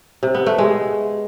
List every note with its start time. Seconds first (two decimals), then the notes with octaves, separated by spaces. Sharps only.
0.23 C3
0.35 B3
0.46 A3
0.58 G#3